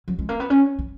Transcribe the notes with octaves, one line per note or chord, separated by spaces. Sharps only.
F#3
G#3
A#3
B3
C#4
B3